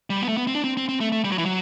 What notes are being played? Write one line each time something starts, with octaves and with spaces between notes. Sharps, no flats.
G3
B3
A3
B3
C4
D4
C4
C4
C4
A3
A3
G3
F#3
E3
F#3